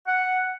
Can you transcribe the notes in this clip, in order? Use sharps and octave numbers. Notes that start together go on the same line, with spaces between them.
F#5